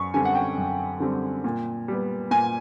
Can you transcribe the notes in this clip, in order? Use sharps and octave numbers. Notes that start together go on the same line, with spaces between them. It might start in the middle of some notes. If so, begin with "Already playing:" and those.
Already playing: F#2 C#6
D3 G3 C4 G#5
F#5
G5
F#2
D3 G3 C4
A#2
G3 B3
A#2 G#5